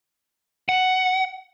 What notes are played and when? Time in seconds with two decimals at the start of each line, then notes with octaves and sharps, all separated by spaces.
0.69 F#5